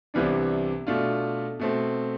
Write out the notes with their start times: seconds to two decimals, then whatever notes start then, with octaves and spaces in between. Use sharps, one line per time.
0.14 C2 C3 E3 B3 D4
0.87 B2 A3 D4 F4
1.60 B2 A3 C4